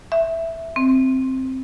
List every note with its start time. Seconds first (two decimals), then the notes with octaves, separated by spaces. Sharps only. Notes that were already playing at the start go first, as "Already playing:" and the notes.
0.12 E5
0.76 C4